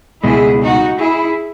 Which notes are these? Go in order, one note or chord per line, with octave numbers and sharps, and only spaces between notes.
C#2 B2 G#3 E4 G#4
D#4 F#4
E4 G#4